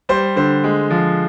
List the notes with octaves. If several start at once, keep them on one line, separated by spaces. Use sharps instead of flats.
G3 C5
D3 C5
G#3
F3